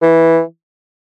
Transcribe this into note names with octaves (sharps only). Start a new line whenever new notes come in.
E3